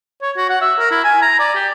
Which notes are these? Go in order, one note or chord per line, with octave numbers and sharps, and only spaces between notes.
C#5
F#4
F#5
E5
A#4
E4
G#5
A#5
D5
G4